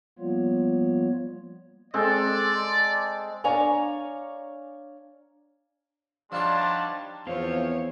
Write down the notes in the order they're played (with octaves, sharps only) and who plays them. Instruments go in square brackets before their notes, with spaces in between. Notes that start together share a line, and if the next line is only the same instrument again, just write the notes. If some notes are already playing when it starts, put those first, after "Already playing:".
[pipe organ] F3 G3 A#3 B3 F4 C#5
[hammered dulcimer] G#3 C4 A4 [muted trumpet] D5
[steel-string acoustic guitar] D4 C#5 F5 G#5 A#5
[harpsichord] F3 D#4 C#5 [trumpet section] G3 F#5 A5 [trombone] D4 [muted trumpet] C6
[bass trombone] E2 [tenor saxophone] F3 [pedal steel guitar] C4 C5 F5 [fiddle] C#5